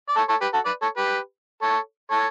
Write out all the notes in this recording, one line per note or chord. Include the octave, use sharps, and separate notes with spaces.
D5
A4 C#5
A4 C#5
G4 B4
F#4 A4
B4 D5
A4 C#5
G4 B4
A4 C#5
A4 C#5